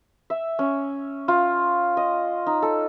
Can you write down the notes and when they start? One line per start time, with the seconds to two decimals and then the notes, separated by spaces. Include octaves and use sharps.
0.30 E5
0.59 C#4
1.28 F4
1.97 D#5
2.46 D#4
2.62 A4